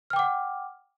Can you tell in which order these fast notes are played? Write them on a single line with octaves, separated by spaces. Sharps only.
F6 G5 D6 F#5